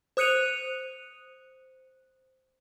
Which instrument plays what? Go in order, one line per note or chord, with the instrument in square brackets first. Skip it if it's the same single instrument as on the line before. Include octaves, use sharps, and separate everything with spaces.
[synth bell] C5 D#6 F#6 C#7 D#7 F7